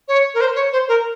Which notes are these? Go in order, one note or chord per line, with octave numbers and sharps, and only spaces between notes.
C#5
A#4
C5
C#5
C5
A#4